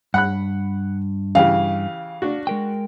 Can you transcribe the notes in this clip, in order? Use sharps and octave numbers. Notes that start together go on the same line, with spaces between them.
G2 F#5 B5 F#6
C#3 E3 G4 F5
D4 F#4
G#3 A#4 G5